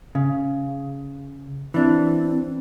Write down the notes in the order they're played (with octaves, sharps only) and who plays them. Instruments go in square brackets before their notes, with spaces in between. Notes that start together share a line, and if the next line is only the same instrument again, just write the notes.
[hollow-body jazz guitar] C#3
[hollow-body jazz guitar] E3 D4 [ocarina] C4